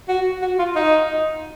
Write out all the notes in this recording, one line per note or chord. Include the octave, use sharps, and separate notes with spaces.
F#4
F#4
F4
D#4